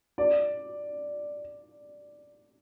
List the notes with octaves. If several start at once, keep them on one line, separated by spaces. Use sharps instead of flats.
D5